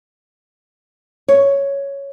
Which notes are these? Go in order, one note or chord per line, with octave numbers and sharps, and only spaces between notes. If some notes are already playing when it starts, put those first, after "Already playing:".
C#5